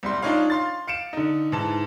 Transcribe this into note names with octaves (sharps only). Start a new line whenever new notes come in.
C2 G3 C6
D4 D#4 F4 C#5 F5
F5 C6 A6
F5 C#7 D7 E7
D3 D#4
G#2 E3 A5